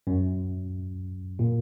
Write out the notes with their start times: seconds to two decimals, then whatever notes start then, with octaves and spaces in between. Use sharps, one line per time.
0.07 F#2
1.39 A#2